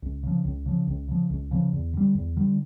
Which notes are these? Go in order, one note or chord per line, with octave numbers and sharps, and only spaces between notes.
C#2
C#3 F3
C#2
C#3 F3
C#2
C#3 F3
C#2
C#3 F3
E2
D3 G3
E2
D3 G3